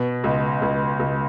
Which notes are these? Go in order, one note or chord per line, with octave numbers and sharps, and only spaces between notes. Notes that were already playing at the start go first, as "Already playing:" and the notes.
Already playing: B2
C#2
C#2
C#2